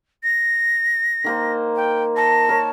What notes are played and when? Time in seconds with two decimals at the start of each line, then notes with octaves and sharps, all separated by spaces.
0.23 A#6
1.24 D#3 A#3 C5
1.76 G5
2.17 A5 A#6
2.49 A#4 C#5